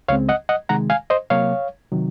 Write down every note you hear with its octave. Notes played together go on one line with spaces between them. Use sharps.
C#2 C#3 G#3 C4 C#5 F5
D#5 F#5
D#5 F#5
C3 D#3 G#3 F#5 A#5
F5 G#5
C5 D#5
C3 F#3 A#3 C#5 F5
C3 D#3 F#3